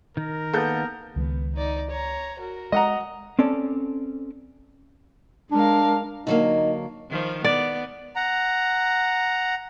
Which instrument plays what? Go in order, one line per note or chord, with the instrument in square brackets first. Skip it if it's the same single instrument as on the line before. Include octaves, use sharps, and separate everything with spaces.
[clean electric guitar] D#3 [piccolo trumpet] A#4
[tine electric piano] A#3 B3 [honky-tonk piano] A4 G6
[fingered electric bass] C#2 D#3 G#3 [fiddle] B3
[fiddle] D#4 D5
C#5 A#5
F#4 A#4
[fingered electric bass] G#3 [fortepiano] D#5 F#5 A#5
[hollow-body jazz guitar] C4 C#4 A4 D5
[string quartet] G#3 A#4 F5 [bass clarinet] D4
[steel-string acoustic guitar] D3 F#3 A#3 [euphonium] D#4
[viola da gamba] D#3 F3
[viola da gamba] B3 [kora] D5
[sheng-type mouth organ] F#5 A#5